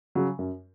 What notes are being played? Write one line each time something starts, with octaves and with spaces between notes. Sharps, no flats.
C#3 F#3
F#2